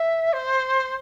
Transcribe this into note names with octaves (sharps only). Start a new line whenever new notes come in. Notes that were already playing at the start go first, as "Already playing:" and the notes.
Already playing: E5
C5